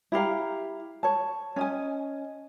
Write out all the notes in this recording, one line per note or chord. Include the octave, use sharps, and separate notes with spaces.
E4 G4 F5 A#5
C#5 A5
C#4 D#5 G#5